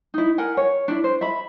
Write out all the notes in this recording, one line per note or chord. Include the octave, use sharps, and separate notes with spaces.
D#4 E4
A#4 F#5 G#5
C#5
D4 E4
C5
E5 B5